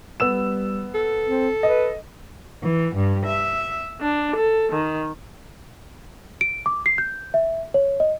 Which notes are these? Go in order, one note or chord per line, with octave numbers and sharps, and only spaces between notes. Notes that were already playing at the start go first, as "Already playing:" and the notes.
G3 B3 E6 E7
A4
C4
B4 D#5
E3
G2
E5
D4
A4
D#3
D7
D6
C7
G6
E5
C#5
D#5